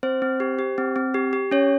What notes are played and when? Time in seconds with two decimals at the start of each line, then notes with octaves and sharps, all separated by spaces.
0.03 C4 C5
0.22 C4
0.40 G4
0.59 G4
0.78 C4
0.96 C4
1.14 G4
1.33 G4
1.51 C#4 C#5